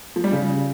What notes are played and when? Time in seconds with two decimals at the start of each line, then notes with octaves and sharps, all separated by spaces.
0.16 F3
0.24 G3
0.32 C#3